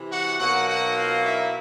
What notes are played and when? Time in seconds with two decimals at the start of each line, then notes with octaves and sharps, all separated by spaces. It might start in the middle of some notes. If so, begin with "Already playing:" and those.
Already playing: C3 E3
0.10 F#4 F#5
0.39 B2 F#3 A#3 D#4 F#4 F#5
0.67 F#4 F#5
0.96 F4 F5
1.24 E4 E5